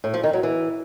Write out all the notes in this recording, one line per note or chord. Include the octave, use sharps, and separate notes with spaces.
A2
F3
D#3
F#3
E3